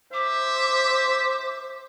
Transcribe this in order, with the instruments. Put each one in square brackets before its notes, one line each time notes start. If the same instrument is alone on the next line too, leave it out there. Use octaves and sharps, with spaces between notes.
[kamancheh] C5 [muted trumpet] E5 [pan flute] D6